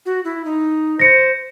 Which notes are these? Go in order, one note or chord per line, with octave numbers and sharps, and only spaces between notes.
F#4
E4
D#4
C5 A#6 C#7